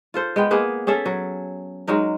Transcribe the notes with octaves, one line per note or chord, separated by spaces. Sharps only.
F4 A4 C5
G#3 B3 G5
A#3 B3 G#4 B4
C#4 G#4 A4 E5
F#3
F#3 G#3 D#4 A#4